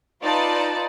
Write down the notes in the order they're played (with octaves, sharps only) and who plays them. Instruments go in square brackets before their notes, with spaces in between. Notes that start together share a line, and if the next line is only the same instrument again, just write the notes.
[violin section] D#4 F4 B4 D5 A5